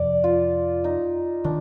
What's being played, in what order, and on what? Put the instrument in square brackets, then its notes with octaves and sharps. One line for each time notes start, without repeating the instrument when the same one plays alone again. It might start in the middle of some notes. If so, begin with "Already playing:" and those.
Already playing: [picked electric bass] F2 C3 F3 [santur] D5
[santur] F4
D#4
[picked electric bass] D#3 [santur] D4